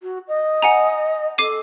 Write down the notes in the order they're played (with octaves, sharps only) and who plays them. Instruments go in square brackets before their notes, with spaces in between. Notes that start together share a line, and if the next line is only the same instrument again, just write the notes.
[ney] F#4
D#5
[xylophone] F#5 G#5 A#5
[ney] A4 [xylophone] D6 C7 D#7